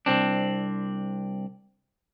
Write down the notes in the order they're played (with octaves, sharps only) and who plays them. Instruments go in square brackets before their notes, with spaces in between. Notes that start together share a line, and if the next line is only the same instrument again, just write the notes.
[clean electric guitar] C2 C4 D4